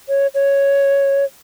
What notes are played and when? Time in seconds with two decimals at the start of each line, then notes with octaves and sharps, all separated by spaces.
0.09 C#5
0.35 C#5